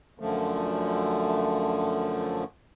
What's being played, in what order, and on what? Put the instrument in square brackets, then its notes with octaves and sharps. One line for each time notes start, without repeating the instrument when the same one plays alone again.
[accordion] F#2 D3 F3 A3